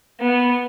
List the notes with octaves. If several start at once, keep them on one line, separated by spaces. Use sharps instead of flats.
B3